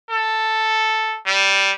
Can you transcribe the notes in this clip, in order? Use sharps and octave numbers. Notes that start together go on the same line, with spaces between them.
A4
G3